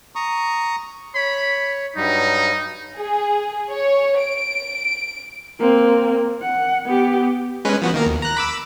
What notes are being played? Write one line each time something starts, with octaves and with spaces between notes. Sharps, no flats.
A#5 C#6 D#6
C#5 B5
G2 F#3 G3 D#4
G#4
C#5
D7
A#3 C4
F#5
B3 G4
G#3 C#4 B4
F3 B3 F#4
D#3 A#3 A#4
D#2
A#5 F#6
B5 D6 E6